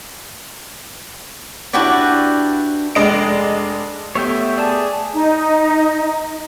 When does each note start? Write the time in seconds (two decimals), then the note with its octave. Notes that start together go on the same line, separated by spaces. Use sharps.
1.73 D4 E4 F#4 G4 B4 D5
2.95 F1 G#3 D4 D#5 D7
4.15 A3 B3 G4 C#5 E5 G5
4.58 G#4 D5 A5
5.15 D#4